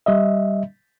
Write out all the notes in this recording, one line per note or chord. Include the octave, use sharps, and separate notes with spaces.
G3 D#5 E5